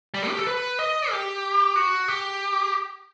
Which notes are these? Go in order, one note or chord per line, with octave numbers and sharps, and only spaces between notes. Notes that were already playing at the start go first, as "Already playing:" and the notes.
G3
A3
G4
A4
B4
D#5
G4
F#4
G4